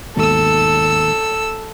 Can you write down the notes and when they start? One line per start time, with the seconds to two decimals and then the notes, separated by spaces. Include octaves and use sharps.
0.16 D#2 G#2 B2 A4 E6